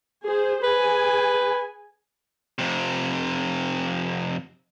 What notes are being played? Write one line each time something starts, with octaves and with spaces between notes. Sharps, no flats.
G#4 C5
G#4 B4 G#5
F2 C3